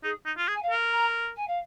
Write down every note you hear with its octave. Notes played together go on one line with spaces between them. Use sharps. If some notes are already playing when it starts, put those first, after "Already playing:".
D#4 G#4
D#4
F4
G#4
G#5
F5
A#4
A#5
G#5
F5